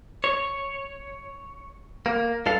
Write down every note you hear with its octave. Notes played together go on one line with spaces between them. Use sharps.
C#5
A#3
G2 A4 F5